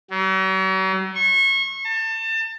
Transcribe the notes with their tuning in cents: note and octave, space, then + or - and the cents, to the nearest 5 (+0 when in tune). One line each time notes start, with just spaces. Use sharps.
F#3 +45
C#6 -30
A5 +30